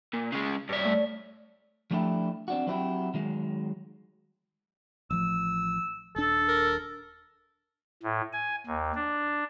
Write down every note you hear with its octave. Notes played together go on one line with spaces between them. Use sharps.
A#2
C#3 G#3
G2 C#5 D5 E5
A3
F3 G3 A3 D4 E4 G4
C4 D4 F#4
F#3 B3 C4 E4 F#4 G4
D#3 F#3 G#3
A1 F3 E6
D#1 D4 A4
A#4
A2
G#5
D#2
D4